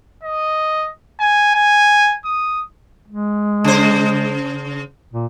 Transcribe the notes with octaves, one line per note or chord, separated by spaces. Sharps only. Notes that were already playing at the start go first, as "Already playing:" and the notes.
D#5
G#5
G#5
D#6
G#3
C#3 C5
A#2